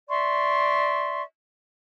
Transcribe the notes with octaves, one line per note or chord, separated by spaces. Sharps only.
D5 E5 C6 C#6